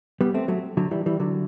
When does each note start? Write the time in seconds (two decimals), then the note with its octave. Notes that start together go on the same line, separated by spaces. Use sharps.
0.21 G3 B3
0.34 A3 C4
0.48 F#3 A3
0.77 D3 F#3
0.91 E3 G3
1.06 E3 G3
1.20 D3 F#3